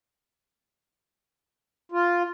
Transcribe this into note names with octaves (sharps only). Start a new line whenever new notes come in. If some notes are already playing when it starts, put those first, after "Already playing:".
F4